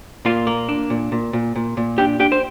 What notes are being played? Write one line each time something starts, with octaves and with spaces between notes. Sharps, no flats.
A#2 F4 F5
A#3
D4
A#2
A#2
A#2
A#2
A#2
D4 G4 G5
D4 G4 G5
C5